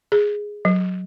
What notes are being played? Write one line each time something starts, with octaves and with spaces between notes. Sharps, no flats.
G#4
F#3